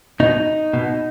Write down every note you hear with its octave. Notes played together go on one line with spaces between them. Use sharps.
B2 D#4
B2